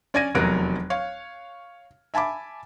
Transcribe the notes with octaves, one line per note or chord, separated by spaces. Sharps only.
C#4 D5 G#5 G#6 A#6 D#7
F1 E2 F#3 A#4 F#6 D7
C#5 F5
E5 G#5 A5 B5 D6